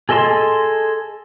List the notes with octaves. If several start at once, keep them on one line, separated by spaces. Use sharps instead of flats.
G#4 A4 D#5 A5 C6